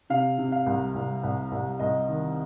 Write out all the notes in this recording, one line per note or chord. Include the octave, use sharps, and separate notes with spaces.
C3 F5
C3
F5
C2
C2
C2
C2
C2 D#5
D#3